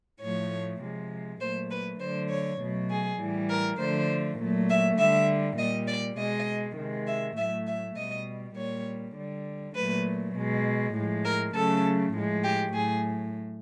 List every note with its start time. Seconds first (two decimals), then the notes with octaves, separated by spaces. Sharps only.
0.21 A2 F3 A3 C#5
0.81 C3 F3 G#3
1.41 A#2 F#3 A3 C5
1.71 B4
2.00 D3 F#3 A3 C5
2.30 C#5
2.60 B2 F#3 A3
2.90 G#4
3.19 A2 E3 G3
3.49 A#4
3.79 D3 F3 A3 C5
4.39 A#2 F#3 A3
4.69 E5
4.98 D3 G3 E5
5.58 A#2 G3 D#5
5.88 D5
6.17 B2 G#3 D#5
6.77 C3 D#3 G#3
7.07 E5
7.37 A2 F#3 A3 E5
7.67 E5
7.96 B2 G3 D#5
8.56 A#2 G3 C#5
9.16 D3 G3
9.75 A#2 F#3 A3 B4
10.35 B2 G#3
10.95 A2 F3 G#3
11.25 A#4
11.54 C#3 F#3 A3 A4
12.14 A2 F3 G#3
12.44 G4
12.73 A2 F#3 A3 G#4